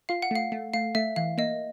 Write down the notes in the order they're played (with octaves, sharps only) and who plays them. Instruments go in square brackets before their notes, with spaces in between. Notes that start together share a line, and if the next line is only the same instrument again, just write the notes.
[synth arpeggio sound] F4 [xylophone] F5
[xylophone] F#5
[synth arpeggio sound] A3 [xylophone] F5
[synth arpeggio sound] A3
[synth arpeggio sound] A3 [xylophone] F5
[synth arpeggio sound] A3 [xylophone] E5
[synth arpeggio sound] E3 [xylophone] F5
[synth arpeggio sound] A#3 [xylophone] D#5